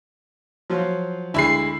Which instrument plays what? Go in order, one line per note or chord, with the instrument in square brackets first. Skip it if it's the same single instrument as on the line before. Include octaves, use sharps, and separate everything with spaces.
[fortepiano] F3 F#3 F4
[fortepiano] D2 G#3 [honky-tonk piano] E4 B5 C7